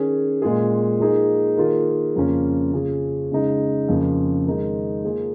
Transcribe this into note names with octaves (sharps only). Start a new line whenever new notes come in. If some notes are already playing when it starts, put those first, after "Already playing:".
Already playing: D#3 C#4 G#4
A#2 G#3 F4 G#4
F3 A#3 D#4 G#4
D#3 A#3 F4 G#4
F2 C#3 A#3 C#4 F4
C#3 F3 C#4 G#4
C#3 G#3 D#4 G#4
F2 C#3 F3 A#3
D#3 G#3 D#4 G#4
F3 A#3 F4 G#4